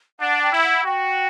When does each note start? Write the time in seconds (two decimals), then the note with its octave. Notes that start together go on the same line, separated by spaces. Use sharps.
0.20 D4 F#5
0.42 G5
0.52 E4
0.63 F#5
0.85 F#4 G5